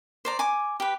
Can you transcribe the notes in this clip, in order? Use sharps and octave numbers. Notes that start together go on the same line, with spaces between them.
C5 D5 A#5
G#5 C#6 D6
G4 B4